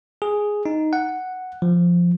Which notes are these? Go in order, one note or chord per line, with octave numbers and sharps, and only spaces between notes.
G#4
D#4
F#5
F3